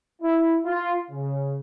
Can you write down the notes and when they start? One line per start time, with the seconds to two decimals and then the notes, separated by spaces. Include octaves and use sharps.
0.22 E4
0.66 F4
1.11 C#3